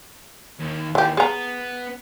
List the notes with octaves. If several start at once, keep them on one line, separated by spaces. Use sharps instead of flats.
D#2
D#2 E3 G4
B3 G#4 A#5